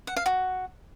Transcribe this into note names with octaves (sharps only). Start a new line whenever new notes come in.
F#5
F5
F#4